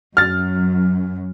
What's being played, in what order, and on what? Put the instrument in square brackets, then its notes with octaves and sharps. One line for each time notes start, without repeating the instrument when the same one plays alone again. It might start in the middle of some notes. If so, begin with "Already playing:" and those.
[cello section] F#2 F#3 [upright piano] F6 A6